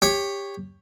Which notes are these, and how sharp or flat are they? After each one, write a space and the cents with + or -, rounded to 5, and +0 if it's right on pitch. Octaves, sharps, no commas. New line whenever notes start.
G4 +20 C#5 +0